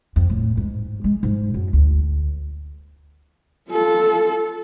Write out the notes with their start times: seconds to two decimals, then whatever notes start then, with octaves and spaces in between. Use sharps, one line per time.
0.16 F2
0.30 A2
0.57 G#2
1.04 G#3
1.23 G#2
1.54 F#2
1.73 D2
3.70 F4 A4